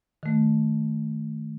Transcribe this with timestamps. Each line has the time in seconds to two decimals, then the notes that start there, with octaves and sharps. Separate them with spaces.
0.23 D#3 A3